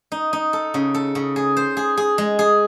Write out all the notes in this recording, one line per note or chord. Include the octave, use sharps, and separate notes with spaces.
D#4
D#4
A4
C#3
A4
C#3
G#4
C5
G#4
G#4
G#3
G#4